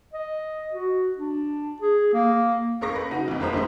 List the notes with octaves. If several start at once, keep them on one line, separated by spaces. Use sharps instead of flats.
D#5
F#4
D4
G#4
A#3
A1 A4 A#4 F5 C#6 A#6
B4
C#3 D#4 F#4
B1 F2
G1 A#3 B4 C5 A#5 D#6
B1 G2 A3 C6